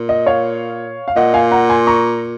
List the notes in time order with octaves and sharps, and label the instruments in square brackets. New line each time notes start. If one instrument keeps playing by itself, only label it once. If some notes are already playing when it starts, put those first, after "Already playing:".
Already playing: [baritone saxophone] A#2
[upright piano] D#5
C#5 F5
F5
[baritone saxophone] A#2 [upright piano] D#5 F#5
[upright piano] F5 G#5
F#5 A#5
G#5 C6
A#5 C#6